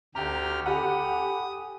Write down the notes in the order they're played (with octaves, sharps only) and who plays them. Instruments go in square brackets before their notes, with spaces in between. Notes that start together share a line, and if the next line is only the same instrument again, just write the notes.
[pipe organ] D2 G4 F6 [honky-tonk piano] G5 A#5
[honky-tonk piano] G4 F#5 [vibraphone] A4 G#5 B5 [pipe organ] D#6